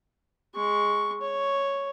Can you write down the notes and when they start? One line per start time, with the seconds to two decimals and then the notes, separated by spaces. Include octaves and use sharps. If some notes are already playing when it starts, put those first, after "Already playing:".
0.56 G#3 C#6
1.21 C#5